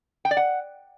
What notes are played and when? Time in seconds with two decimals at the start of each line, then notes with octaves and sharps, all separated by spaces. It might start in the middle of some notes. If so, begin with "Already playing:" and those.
0.25 G5
0.31 D5
0.37 F#5